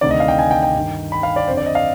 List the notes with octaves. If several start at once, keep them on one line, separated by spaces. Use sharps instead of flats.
D2 C3 D#3 D5
D#5
F5
G5
G#5
G5
G5
G2 D#3
B5
F5
D5
F2 D3 C5
D5
D#5
F5